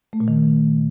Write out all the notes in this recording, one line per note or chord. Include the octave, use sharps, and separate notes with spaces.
A3
A#2
D#3